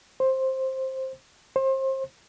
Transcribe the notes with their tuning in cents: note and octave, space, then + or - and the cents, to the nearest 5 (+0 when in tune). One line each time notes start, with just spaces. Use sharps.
C5 +10
C5 +30